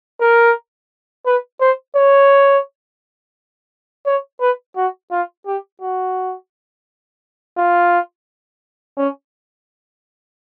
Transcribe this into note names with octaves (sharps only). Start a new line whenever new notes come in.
A#4
B4
C5
C#5
C#5
B4
F#4
F4
G4
F#4
F4
C#4